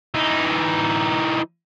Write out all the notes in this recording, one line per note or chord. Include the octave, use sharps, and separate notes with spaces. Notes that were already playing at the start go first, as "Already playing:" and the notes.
E3 D#4